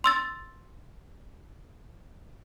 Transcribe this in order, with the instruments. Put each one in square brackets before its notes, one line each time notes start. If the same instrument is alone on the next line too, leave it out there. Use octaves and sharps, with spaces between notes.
[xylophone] C6 E6 A6